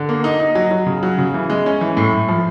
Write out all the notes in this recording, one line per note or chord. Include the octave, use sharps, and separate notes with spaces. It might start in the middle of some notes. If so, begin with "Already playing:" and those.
Already playing: D3
A#3
D#4
D#4
F#3
F#3
C#3
F#3
C#3
E3
G#3
C#4
E3
A2
A2
F3